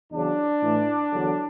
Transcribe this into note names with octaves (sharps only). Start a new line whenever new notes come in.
E2 C#3 F#3 D4
A2 E3
E2 D3 F#3